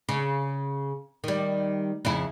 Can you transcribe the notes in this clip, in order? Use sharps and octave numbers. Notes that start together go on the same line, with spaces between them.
C#3
D#3 G3
F2 C#3 E4